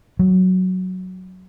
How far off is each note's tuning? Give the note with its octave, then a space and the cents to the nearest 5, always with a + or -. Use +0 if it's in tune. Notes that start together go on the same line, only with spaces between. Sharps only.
F#3 +0